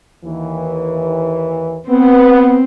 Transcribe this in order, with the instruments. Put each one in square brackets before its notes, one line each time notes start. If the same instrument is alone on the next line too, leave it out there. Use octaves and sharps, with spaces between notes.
[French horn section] D#2 E3
[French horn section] B3 [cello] C4